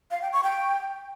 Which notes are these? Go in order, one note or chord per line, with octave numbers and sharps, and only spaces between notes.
F5
G5
C#6
G5